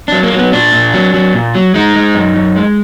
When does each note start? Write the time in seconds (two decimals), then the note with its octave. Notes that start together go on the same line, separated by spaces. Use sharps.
0.08 F#3 D4
0.23 A#3
0.33 F#3
0.38 B3
0.52 A#2 D4
0.73 A#2
0.94 F#3
1.14 F#3
1.34 A#2
1.55 F#3
1.74 G#3 D#4
1.96 G#3
2.15 F#2
2.36 F#2
2.56 G#3